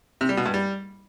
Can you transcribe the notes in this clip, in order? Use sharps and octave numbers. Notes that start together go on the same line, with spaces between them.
C3
G3
B2
G2
G3